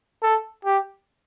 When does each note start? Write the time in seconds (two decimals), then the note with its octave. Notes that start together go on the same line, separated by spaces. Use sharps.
0.22 A4
0.65 G4